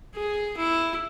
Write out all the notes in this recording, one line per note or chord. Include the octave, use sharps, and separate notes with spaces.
G#4
E4